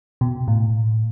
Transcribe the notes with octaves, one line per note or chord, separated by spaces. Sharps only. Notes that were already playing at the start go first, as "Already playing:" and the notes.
B2
A2